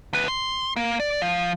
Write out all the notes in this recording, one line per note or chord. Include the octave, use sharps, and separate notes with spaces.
D2 B4
C6
A#3
D5
F3